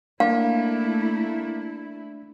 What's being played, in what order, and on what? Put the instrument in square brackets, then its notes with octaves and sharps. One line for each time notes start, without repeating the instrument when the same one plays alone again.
[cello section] A3 E4 [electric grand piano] A#3 [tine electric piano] D4 [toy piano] F5